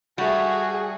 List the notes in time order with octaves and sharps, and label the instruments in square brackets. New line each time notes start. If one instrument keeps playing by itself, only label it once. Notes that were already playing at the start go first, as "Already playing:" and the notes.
[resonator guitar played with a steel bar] G3 A3 [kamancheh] F#4 G#4